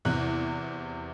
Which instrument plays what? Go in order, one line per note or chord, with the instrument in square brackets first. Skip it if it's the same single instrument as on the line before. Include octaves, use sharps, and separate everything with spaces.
[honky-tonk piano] E2 C3 E3 F#6